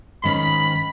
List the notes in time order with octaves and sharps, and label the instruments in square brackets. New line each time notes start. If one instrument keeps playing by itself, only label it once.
[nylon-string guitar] G#2 D#3 C#4 [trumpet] B5